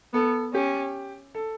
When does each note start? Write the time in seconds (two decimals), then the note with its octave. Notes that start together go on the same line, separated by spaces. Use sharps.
0.14 B3 A4
0.54 C#4 G4
1.35 A4